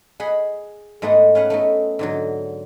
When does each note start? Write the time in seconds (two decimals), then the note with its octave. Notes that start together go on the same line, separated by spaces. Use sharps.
0.20 G#4 D#5 F#5 B5
1.02 G#2 G#3 A3 B3 D#4 F#5
1.35 C#4 B4 F5 F#5
1.50 A3 B3 D#4
1.99 G#2 D3 F#3